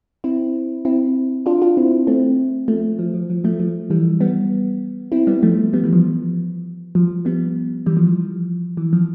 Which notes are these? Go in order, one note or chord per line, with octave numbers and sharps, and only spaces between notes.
C4 E4
C4 E4
D4 F4
D4 F4
C4 E4
A3 C4
F3 A3
F3
F3
F3
F3 A3
F3
E3 G3
G3 B3
C4 E4
G3 B3
F3 A3
G3 B3
E3 G3
F3
F3
G3 B3
E3 G3
F3
F3
E3
F3